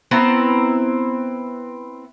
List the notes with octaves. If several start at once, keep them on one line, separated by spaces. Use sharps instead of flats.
B3 C4 E4 A#5